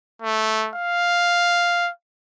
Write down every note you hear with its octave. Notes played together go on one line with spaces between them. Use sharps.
A3
F5